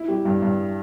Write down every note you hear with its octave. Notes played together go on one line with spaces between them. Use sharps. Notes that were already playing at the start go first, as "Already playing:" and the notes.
Already playing: E4
G3
G2
G2